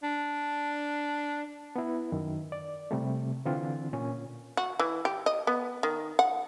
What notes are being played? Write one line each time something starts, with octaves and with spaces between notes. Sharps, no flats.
D4
B3 E4
F#2 D#3
D5
C3 G3 A3
D3 E3 C4 D4 F4
A#2 C#4
F#4
E3
G4
D#5
B3
D#3
F#5